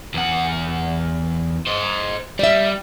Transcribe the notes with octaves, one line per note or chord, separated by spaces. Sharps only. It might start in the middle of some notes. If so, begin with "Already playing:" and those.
E2 F#5
C5 D#5
G3 D5 E5